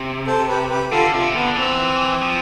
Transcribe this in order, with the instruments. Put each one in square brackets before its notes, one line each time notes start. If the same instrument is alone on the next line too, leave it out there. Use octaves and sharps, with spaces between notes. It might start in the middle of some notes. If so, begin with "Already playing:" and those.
Already playing: [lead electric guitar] C3
[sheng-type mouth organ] A4 C5
G4 B4
G4 B4
[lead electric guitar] D3 [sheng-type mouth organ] F4 A4
[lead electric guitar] C3 [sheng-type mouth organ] F4
[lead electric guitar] D3 [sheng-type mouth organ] B3
[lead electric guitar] E3 [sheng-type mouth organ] C4
[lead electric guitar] F3